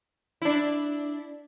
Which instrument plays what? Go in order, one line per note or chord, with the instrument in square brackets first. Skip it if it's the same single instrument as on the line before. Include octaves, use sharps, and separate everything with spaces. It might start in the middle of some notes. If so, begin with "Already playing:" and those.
[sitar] D4 E4